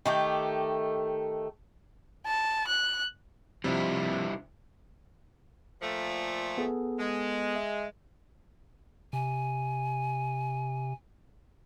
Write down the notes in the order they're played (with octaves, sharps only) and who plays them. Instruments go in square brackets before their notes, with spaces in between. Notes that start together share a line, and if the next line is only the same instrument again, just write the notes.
[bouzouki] D#3 A3 G4
[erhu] A5
F#6
[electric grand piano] C3 F3 [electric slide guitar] G3 D4 E4
[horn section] A#2 F3 A3
[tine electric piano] B3 G#4 A4
[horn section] G#3
[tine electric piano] E5
[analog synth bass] C3 [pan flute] G#5